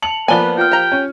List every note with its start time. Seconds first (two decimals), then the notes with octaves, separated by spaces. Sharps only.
0.02 A5 C#7 F7 F#7
0.28 F3 A#3 B3 B4 D5 G#5 A5 G7
0.58 F4 G5 F6
0.71 G4 A#5
0.92 C#4